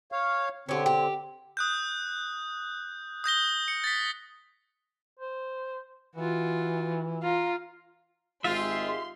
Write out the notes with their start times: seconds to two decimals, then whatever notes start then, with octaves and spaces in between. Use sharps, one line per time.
0.12 C#5 F5
0.69 D3 C4 C#4 G4
0.86 G4
1.57 D#6 F#6 G6
3.24 D#6 G6 A#6 G7
3.68 C#7
3.84 A6 B6
5.20 C5
6.16 E3 F4 F#4
7.23 F4 A#5
8.44 G#1 G#3 F4 G4 E5 C6